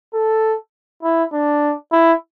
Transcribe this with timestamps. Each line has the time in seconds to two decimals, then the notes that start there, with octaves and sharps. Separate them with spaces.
0.14 A4
1.03 E4
1.33 D4
1.92 E4